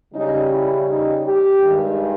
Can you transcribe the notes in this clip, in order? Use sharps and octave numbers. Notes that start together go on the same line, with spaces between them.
C#3 G3 C#4 D#4
E4
D#4
G4
G2 D#3 G#3